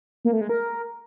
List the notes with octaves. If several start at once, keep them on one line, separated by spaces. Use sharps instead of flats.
A#3
A3
G#3
A#4